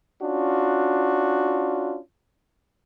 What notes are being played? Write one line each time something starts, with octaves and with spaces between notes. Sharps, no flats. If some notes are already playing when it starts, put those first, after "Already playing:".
C#4 D4 F4 F#4